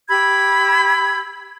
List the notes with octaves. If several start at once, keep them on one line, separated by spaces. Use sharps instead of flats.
G4 B5 E6 G#6